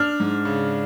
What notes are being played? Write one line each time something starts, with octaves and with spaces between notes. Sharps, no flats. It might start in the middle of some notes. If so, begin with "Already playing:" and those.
Already playing: D4 F6
G#2
C#3